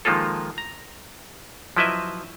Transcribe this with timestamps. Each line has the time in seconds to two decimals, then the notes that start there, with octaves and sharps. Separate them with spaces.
0.05 D#3 F3 G#3 A#3 F4 A4
0.58 A#5
1.77 F3 F#3 E4 B4 D#5 E5